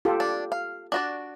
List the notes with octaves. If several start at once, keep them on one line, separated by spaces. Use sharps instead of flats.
F4 G4 A4
D4
F5
D4 F#4 D5